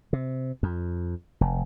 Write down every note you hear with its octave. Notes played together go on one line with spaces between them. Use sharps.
C3
F2
F1